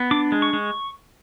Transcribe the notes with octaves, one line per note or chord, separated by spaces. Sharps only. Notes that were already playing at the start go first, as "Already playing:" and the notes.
Already playing: B3
D4 D6
G#3
C#6
G#3